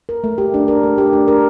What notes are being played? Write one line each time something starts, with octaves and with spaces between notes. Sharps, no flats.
A#4
A3
G4
D4
A#4
A3
G4
D4
A#4